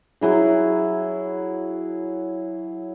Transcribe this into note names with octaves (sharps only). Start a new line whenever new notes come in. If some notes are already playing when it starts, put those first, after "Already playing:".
F#3 E4 G#4